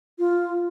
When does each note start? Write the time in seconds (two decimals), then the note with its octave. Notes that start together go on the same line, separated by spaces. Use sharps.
0.19 F4